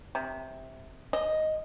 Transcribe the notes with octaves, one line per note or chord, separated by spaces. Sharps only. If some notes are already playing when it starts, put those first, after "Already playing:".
C3
D#5